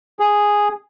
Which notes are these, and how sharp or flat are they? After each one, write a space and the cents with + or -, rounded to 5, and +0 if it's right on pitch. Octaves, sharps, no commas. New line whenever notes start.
G#4 -5